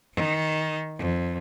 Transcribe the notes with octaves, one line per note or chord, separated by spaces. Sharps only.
D#3
F2